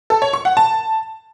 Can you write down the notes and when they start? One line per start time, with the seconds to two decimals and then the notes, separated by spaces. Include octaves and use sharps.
0.10 A4
0.22 C#5
0.33 C#6
0.45 F#5
0.57 A5